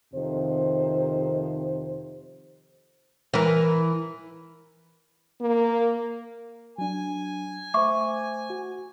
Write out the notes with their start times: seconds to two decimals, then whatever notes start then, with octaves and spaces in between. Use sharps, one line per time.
0.14 F2 C3 D#3 C5
3.34 E3 A#4
5.41 A#3
6.78 F#3 D4 G#5
7.74 A3 C5 E5 C#6 D6
8.50 F#4